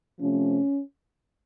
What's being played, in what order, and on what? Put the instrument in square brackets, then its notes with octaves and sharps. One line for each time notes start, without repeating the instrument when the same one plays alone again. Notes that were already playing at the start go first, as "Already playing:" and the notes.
[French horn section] C3 F3 A3 C#4